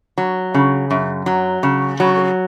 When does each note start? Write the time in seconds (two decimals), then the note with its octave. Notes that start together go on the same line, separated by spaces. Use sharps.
0.18 F#3
0.54 C#3
0.91 F#2
1.26 F#3
1.63 C#3
2.00 F#3